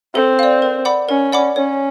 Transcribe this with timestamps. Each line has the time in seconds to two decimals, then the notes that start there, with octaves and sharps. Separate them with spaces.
0.15 C4 A4
0.39 D5 F5
0.62 A#4
0.85 D5 F#5 B5 D6
1.09 C#4 A#4
1.32 D5 F#5 B5 D6
1.56 C#4 C#5